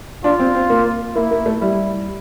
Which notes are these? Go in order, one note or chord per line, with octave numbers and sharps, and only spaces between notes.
D4 F4
C4
C4
A#3
A#3 E4
A#3
A3
G3 E4